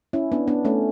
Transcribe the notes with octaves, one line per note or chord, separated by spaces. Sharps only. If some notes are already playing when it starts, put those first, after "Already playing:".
C#4 E4
B3 D4
B3 D4
A3 C#4